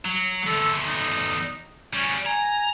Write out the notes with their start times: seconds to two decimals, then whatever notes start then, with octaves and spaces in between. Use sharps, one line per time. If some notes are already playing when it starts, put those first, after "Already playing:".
0.05 F#3
0.47 E2 D3 A4
0.85 D#4
1.93 C#3 G3 C#4
2.26 G#5 A#5